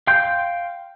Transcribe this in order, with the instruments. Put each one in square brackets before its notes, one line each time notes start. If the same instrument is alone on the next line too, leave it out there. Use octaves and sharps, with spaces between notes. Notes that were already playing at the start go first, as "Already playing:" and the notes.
[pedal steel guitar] F5 G5 C6 G6